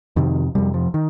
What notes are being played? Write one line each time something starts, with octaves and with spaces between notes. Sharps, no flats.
F2 C3 D#3
F2 C3 G3
F3
D#3